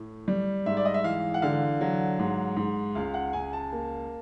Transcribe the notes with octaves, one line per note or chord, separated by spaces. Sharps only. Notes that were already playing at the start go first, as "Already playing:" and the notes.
Already playing: A2
G3
G#2 E5
D5
D#5
E5
E3 F5
F#5
D3 F5
F#3
G#2
G#2
C#2 F5
F#5
C#2 G#5
A5
A#3